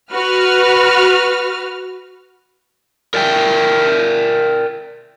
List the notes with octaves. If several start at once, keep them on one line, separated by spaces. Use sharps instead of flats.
F#4 B4 F6
A#4 D5 E5 G5